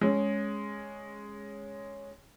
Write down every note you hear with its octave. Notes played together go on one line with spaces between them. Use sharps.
G#3 C#4